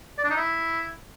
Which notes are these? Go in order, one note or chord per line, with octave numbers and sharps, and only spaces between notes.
D5
D4
D#4
E4